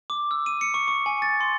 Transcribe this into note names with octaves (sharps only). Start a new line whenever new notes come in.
D6
E6
D#7
C#7
C#6
C#6
G#5
A6
C6